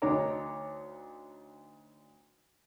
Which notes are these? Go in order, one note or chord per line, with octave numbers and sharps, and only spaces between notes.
D2 D4 D#4 C#5 A#5 D6